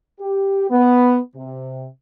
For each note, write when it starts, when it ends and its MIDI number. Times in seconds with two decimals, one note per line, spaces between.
0.21 0.70 67
0.71 1.19 59
1.36 1.86 48